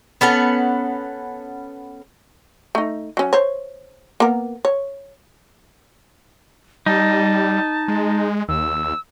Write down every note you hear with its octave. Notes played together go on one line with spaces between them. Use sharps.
B3 C#4 A4 F#5
A3 D#4
F#3 C#4
C5 C#5
A#3 B3 A#4
C#5
G3 D#4 A5
G#3
D#2 E6